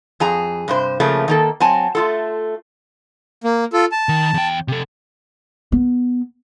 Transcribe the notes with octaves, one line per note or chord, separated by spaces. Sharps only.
F2 G#4 A#5
G2 C3 C5
C#3 F3 A3 A#3
D#3 A#3 A4
F#3 C4 G#5 A5
A3 F4 A4
A#3
F4 A4
A5
D#3
E2 G5
C3 A4
B3